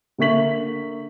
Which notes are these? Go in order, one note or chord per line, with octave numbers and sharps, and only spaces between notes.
D3 A#3 E5 C#6 B6 F#7